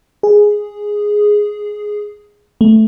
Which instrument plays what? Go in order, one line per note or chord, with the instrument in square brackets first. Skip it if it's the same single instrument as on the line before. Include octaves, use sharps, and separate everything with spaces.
[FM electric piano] G#4
A3